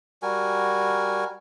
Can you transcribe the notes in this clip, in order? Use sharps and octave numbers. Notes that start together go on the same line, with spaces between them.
G3 F#4 A#4 G#5